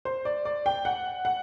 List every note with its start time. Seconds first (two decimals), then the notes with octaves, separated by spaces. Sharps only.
0.05 C5
0.25 D5
0.45 D5
0.66 G5
0.85 F#5
1.25 F#5